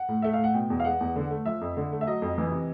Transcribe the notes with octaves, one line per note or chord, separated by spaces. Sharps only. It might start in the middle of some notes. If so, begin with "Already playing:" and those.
Already playing: F#5
A2
A3 E5
F5
A2
F#5
B2 G5
E2
F5
G#3 F#5
E2
D3
A3
F3 E5
F2
D3
A3
E5
F#3 D#5
F2
E3
C3